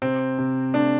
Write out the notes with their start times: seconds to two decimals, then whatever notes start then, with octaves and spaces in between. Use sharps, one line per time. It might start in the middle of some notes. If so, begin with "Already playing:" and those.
0.02 C3 C4
0.38 C3
0.74 A3 D4